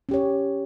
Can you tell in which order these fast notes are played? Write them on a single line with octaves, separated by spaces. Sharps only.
C#4 G4 C#5